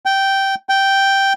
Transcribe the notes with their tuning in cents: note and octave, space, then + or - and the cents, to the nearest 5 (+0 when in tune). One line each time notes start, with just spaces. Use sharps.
G5 -10
G5 -5